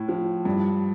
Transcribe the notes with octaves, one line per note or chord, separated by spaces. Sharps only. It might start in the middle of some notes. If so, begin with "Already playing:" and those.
Already playing: A2
F3
G2